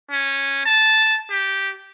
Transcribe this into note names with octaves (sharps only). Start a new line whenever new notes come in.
C#4
A5
G4